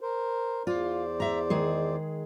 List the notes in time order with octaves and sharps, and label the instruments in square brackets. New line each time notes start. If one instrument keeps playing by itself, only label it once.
[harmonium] A#4 C5
[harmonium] E2 C5 D5 [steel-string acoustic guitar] F4
[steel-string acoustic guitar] E5 A#5
D#3 G#3 G#4